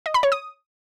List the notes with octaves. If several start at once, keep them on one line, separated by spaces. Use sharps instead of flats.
D#5
B5
C#5
D#6